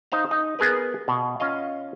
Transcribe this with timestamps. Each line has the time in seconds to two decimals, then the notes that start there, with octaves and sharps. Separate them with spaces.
0.12 D#4 C5 F5 A#5
0.31 D#4
0.59 B3 G#4 A#4 B4
1.08 B2
1.40 C#4 F4 D#5 F5